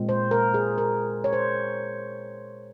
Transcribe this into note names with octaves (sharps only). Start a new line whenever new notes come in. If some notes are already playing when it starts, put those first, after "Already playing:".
Already playing: A#2 G#3 C4
C5
A#4
G#4
A#4
C#5
C5